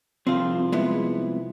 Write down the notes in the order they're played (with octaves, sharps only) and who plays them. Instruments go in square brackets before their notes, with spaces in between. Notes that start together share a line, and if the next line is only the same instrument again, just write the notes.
[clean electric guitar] C2 F3 [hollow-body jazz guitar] C4 F5
[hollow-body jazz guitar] G#3 B3 E4